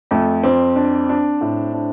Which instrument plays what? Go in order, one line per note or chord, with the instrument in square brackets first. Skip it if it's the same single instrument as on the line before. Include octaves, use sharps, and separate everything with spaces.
[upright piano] F2 [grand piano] A3
[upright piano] F2 [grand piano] C4
[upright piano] D4
D4
A2
D4